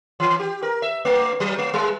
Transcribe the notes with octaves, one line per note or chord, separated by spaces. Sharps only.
E3
G4
A#4
E5
A3
F#3
A3
G3